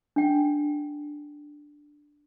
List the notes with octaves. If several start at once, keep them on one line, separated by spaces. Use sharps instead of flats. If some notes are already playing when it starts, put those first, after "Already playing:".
D4 G5